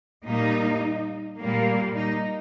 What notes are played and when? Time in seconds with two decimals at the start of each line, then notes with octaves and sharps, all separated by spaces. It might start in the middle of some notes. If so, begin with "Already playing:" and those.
0.25 A#2 G3 A#3 D#4
1.38 A#2 G3 A#3
1.95 D#4